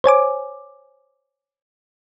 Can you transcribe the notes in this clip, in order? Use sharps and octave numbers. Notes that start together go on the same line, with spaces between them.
C5 C#5 G#5 D6